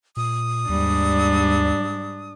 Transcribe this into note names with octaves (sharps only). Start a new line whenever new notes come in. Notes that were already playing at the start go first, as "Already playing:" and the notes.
A#2 D#6
D#2 G#2 G3 D4